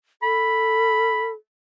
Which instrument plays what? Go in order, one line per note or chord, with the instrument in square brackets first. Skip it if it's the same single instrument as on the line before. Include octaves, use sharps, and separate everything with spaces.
[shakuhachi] A4 [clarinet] B5